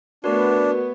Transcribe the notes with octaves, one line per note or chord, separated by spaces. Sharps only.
A3 B3 D4 F#4 A#4 B4 C#5 D5